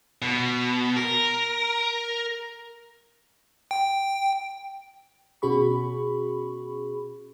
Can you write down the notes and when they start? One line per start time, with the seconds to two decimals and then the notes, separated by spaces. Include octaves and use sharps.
0.22 B2
0.97 A#4
3.71 G5
5.42 B2 C#4 F#4 G#4 B5 C#6